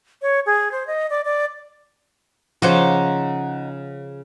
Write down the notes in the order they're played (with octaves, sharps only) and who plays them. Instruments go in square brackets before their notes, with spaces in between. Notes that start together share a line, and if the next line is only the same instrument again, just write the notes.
[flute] C#5
G#4
C5
D#5
D5
D5
[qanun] C#3 C5 D6 [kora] F3 C#5 [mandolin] D#4 F#5